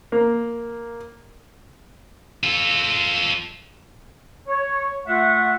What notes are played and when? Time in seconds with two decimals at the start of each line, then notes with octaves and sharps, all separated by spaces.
0.12 A#3
2.43 F4 A4
4.48 C#5
5.07 A3 F4 E5 F#5